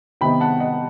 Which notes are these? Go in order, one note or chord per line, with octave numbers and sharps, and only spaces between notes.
C3 D#3 G3 B3 D#4 G5 B5
F#5 A5
D#5 F#5